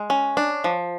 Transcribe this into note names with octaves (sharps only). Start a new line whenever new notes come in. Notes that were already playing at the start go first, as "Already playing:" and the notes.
Already playing: G#3
C#4
D4
F3